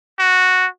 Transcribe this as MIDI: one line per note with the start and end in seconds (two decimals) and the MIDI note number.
0.19 0.67 66